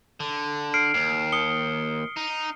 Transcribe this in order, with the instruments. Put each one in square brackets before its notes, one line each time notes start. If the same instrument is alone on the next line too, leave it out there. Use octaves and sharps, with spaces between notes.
[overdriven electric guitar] D3
[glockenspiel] F6 C7 D7
[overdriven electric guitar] D#2 [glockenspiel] C7
[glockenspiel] D#6 C#7 G7
[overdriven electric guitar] D#4